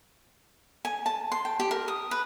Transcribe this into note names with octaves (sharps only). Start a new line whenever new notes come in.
G#5
A5
C6
G5
G4
A#4
D#6
B4